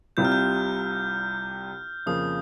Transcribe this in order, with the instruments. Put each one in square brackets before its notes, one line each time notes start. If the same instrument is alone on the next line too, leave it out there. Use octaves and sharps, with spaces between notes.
[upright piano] C2 C3 G3 C4 F4 [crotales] G6
[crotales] F6
G6
[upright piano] F2 C#3 F3 A#3 [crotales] D#6